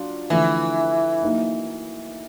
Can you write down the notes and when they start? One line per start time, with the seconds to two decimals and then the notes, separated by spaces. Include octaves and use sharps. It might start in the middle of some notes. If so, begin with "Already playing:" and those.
Already playing: F#3 D4 F4
0.30 D3 E3 F3 A3
1.23 F#3 A#3 D#4